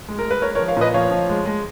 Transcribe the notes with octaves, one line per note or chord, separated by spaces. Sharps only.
G#3
A#4
G#3
B4
G#3 A#4 C#5
A#4 C#5
F3
C#5 F5
A#2 B4 D#5
F3 C#5 F5
F3
G#3
G#3